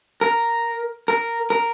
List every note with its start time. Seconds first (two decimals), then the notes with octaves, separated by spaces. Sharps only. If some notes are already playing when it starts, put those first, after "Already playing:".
0.21 A#4
1.08 A#4
1.50 A#4